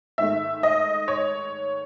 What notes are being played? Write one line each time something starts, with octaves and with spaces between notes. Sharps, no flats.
G#2 D#3 A3 E5
D#5
C#5